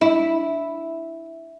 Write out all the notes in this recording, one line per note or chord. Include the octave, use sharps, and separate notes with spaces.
E4